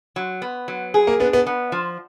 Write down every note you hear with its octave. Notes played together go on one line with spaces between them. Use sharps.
F#3
B3
F#3
G#4
A#3
B3 D4
B3
B3
F3